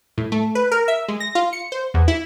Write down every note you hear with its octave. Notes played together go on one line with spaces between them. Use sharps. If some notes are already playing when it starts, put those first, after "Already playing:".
A2
A3
B4
A#4
E5
G#3
A#6
F4
C#7
C5
E2
E4